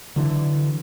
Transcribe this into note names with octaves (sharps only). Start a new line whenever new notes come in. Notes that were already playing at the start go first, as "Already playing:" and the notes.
D3 E3 F#3